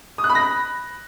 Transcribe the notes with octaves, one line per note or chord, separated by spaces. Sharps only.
D#6
F#6
B5
A#6
B5